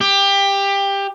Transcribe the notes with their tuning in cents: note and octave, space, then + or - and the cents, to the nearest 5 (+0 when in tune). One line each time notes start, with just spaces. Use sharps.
G4 +20